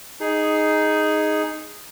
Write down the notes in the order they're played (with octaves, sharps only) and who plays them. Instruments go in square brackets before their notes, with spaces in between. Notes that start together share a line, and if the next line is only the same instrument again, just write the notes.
[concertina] D#4 G#4